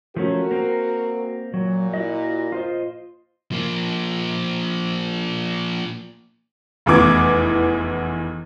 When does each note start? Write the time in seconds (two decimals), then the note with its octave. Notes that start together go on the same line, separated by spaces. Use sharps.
0.16 F3 A3 C#4 F#4 A#4
0.51 A#3 C4
1.54 A#2 F#3
1.94 E4 F#4 D#5
2.52 F4 C5 D#5
3.52 F3 A#3
6.86 F1 E2 E3 B3 D6 G#6